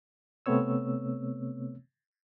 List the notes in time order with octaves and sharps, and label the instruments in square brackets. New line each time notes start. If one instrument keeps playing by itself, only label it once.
[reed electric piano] C3 A3 B3 C4 C#5 E6